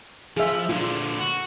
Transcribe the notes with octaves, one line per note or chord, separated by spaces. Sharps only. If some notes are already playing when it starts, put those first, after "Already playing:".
F3 G#4 E5 F5
A#2 D3 F4
F#4